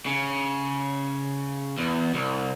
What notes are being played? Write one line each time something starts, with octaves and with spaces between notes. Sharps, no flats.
C#3
E2
C2